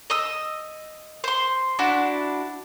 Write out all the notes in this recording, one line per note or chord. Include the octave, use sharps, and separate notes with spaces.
D#5 D#6 E6
C5 C6
D4 E4 F#4